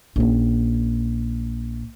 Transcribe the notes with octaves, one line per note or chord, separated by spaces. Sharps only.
A#1 C#4